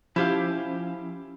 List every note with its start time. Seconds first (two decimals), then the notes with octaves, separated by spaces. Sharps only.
0.16 F3 C#4 E4 G4 F5